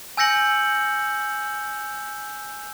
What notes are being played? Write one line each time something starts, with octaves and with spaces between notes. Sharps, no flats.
G#5 E6 G6 A#6 C#7 F#7